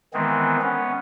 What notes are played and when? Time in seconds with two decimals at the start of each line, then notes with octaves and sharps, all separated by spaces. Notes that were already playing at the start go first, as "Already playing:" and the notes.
0.14 D#3 E3 G#3 B3 C4
0.61 B3 C#4